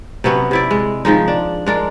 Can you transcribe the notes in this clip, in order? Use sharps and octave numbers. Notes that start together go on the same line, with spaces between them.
C3 F#3 B3 C#4
C3 E4 D5
G#3
D#3 F3 G#3 D#4
D4
G#3 D4 A#4